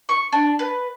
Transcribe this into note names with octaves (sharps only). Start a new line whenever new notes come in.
C#6
D4
B4